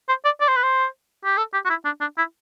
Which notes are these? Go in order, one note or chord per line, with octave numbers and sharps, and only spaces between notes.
C5
D5
D5
C5
B4
C5
G4
A4
G4
F#4
E4
D4
D4
E4